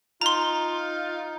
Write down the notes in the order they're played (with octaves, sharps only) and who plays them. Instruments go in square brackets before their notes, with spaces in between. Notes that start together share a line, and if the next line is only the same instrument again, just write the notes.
[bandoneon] D#4 [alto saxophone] F4 [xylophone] A#5 C6